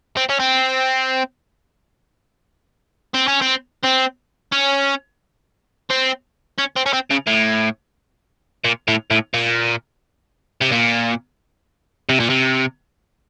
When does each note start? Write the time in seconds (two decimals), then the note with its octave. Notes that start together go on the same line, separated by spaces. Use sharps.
0.17 C4
0.30 C#4
0.40 C4
3.14 C4
3.28 C#4
3.42 C4
3.83 C4
4.52 C#4
5.90 C4
6.58 C#4
6.76 C4
6.86 C#4
6.93 C4
7.11 C#3
7.27 A2
8.65 A#2
8.88 A2
9.11 A2
9.34 A#2
10.61 C3
10.72 A#2
12.09 C3
12.20 A#2
12.30 C3